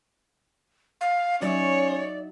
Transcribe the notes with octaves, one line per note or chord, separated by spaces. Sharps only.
F5
F#3 C#4 D#4 C#5 D5 E5